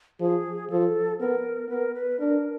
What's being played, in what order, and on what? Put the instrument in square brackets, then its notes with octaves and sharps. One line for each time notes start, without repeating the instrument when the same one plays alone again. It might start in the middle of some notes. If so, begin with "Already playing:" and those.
[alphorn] F3 [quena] G#4
[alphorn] F3 [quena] A4
[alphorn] B3 [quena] A#4
[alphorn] B3 [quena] B4
[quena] A#4
B4
[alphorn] D4 [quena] A#4